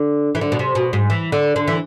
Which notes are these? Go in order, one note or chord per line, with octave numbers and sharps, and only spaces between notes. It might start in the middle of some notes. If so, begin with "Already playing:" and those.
Already playing: D3
E3
D3
B2
C3
B2
G#2
E3
D3
D3
E3